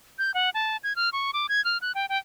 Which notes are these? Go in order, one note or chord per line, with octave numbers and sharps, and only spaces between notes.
G6
F#5
A5
G#6
F6
C#6
D6
G#6
F6
F#6
G5
G5